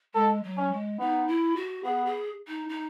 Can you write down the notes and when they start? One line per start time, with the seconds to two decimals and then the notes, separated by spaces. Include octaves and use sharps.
0.14 G#3 A4
0.43 F#3
0.57 C#4
0.71 G#3
0.99 B3 D#4
1.28 E4
1.56 F#4
1.84 B3 G#4
2.05 G#4
2.48 D#4
2.69 D#4